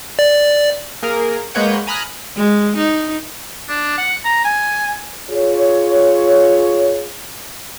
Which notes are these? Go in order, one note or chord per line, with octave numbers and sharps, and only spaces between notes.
D5
A#3 G#4 A#4
G#3 A#3 B4 C#5 F#5 G6
G#5 A#5 B5 D#6 F6 F#6
G#3
D#4
D4
F#5
A#5
G#5
F4 G#4 C#5